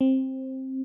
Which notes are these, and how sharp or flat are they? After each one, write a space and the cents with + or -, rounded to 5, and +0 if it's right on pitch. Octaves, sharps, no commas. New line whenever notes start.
C4 +15